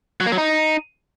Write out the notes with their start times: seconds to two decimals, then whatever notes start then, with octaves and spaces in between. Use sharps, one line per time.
0.20 F#3
0.26 A#3
0.32 F#3
0.38 D#4